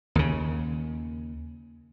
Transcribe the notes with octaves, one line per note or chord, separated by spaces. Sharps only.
D#2 C#3